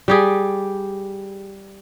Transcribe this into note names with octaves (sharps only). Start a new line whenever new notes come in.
G3 G4 G#4